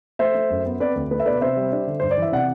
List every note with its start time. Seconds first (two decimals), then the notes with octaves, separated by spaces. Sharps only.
0.19 A3 C5 E5
0.35 A3
0.50 F#2
0.66 B3
0.80 C4 B4 D5
0.96 D2
1.11 A3 B4
1.20 E5
1.26 B2 B4 D5
1.41 C3 C5 E5
1.57 G3
1.72 D4
1.87 D3
2.00 G2 C5
2.11 D5
2.18 E3 E5
2.32 C3 D5 F#5